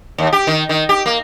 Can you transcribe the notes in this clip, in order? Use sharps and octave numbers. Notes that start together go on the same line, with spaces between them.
D#2
G4
D#3
D#3
G4
A#3